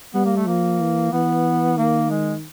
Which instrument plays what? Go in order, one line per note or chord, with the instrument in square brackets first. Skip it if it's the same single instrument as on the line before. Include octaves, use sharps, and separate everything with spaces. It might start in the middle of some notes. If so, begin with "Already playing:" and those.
[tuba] G3 [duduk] B3
[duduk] A#3
A3
[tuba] F3 [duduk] A#3
[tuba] E3
[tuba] E3 [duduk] B3
[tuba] D#3 [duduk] A#3
[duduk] G#3